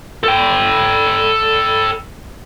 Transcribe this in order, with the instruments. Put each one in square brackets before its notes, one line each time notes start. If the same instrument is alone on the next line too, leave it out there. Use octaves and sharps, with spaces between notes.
[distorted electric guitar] A4 G5